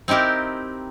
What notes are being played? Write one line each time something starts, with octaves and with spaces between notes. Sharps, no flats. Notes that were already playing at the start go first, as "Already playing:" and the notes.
C4 D#4 E4 G4 A#4